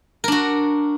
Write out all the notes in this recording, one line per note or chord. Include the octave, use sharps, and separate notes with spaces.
D4 F#4 A#4